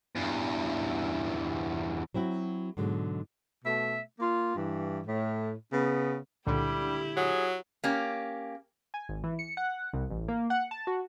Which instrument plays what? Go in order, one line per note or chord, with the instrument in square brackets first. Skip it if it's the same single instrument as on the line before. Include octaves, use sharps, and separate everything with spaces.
[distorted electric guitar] E2 G2
[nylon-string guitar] F#3 C4 E4 F#4
G#2 B2 D3 F#3 G#3
[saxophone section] B2 A3 E5
A#3 F4
G2 E3
A2
C#3 B3
[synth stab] C#2 A#2 D3 [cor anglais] G3 [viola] E4 G4
[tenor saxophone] F#3 [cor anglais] G#4
[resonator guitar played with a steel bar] A#3 C#4 G4
[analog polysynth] G#5
G#1
E3
C#7
F#5
C2
A1
A#3
F#5
A5
F#4